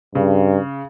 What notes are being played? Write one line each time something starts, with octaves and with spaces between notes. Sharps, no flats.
G2 C#3